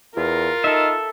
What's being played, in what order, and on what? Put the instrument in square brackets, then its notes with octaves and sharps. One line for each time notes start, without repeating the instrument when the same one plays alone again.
[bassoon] E2 [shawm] F4 [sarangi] A#4
[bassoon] D#4 [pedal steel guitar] A4 E5